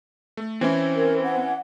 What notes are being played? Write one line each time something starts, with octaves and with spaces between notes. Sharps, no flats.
A3
E3 C4 C#4 E4
A#4
F#5